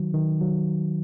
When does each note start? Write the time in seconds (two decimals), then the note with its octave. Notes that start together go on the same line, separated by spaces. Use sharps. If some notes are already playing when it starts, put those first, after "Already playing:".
Already playing: D#3 F#3
0.14 D#3
0.41 F#3